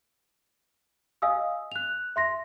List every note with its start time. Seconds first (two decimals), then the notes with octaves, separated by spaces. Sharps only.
1.22 D#5 F5 G#5 D#6 E6
1.72 F#6 F7
2.16 E5 C6 A#6